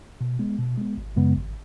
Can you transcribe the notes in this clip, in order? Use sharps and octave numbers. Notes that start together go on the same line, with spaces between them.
B2
G#3 B3
B2
G#3 B3
G#1
F#2 C#3 G#3 B3
G#1